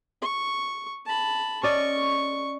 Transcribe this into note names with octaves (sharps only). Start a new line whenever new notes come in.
C#6
A5 B5
C#4 D5 D#5 C#6